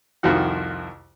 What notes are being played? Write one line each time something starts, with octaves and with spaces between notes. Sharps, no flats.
C2 F2 D#3 F3 F#4 F#5